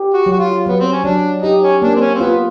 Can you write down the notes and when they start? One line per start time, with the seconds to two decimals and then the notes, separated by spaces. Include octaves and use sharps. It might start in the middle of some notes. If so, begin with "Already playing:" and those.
Already playing: G4
0.14 F#4
0.26 F#3
0.33 F#4
0.39 F4
0.66 F#3 B3
0.80 C4
0.93 C#4
1.04 F#3 D4
1.43 D#4 G4
1.63 C#4
1.82 A#3 D4
1.95 C4
2.01 C#4
2.15 C4
2.20 B3 F4